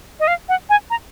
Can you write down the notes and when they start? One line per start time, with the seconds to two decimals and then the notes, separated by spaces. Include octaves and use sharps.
0.20 D#5
0.28 F5
0.49 F#5
0.70 G#5
0.90 A#5